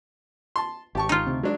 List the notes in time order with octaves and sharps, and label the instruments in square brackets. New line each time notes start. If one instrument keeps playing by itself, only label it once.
[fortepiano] A5 C6
[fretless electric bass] G#1 [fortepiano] G4 A5 C#6
[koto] D#4 F4
[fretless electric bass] D2 C3 C4
[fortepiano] F#3 D4 [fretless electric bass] G#3